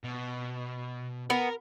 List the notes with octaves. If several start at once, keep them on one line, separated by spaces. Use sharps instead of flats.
B2
B3 A#4